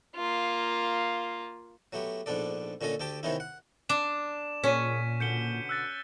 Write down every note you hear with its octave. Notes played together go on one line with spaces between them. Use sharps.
A#3 F4
F#3 A3 B3 G4
A#1 G#2 B3 D4 A4 D5
A#2 D3 C#4 A4 D#5
D2 G4 A4 G5 A5
C3 D#3 B3 C#4 D#4 E4
F#5
D4 E7
A#2 C#4 G#4 C#5 B6 D#7
B2 D3 G6 C#7 G7
E6 F#6 A6